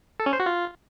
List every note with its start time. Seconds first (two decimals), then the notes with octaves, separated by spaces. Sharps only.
0.20 A4
0.26 C#4
0.33 C5
0.40 F#4
0.46 F4